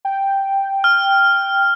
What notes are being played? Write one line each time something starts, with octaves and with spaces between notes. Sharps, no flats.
G5
F6